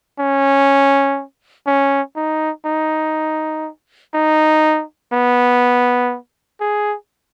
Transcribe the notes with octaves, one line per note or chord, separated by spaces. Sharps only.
C#4
C#4
D#4
D#4
D#4
B3
G#4